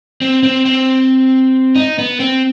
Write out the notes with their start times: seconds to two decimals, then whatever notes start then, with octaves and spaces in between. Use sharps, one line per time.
0.22 C4
0.43 C4
0.66 C4
1.75 D#4
1.99 B3
2.20 C4